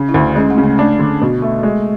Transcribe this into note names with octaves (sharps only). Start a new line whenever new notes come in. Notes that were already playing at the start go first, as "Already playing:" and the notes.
Already playing: C#3
E4
D2 D4
G#3 C#4
A3
C#3
A3
A3 D4
D3
B2
A3
G#3